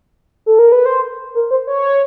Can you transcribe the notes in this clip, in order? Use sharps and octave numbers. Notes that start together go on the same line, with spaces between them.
A4
A#4
B4
C5
A#4
C5
C#5